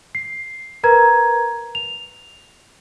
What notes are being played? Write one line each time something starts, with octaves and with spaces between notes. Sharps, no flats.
C7
A#4 B4 A#5 G#6
F7